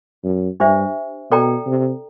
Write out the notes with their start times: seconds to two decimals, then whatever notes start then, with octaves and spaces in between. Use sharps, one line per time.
0.24 F#2
0.60 G2 D4 G4 C5 E5
1.31 B2 A4 D5 G5 A#5
1.66 C3